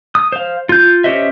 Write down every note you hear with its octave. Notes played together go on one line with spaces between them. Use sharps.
D#6
C5 F5
F4 G6
C#4 G4 C5 D#5 E5